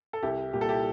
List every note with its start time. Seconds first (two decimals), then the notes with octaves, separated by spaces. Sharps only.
0.13 A4
0.23 C2 E4 G4
0.53 A#2 G3 G4
0.61 A4
0.69 E4 G4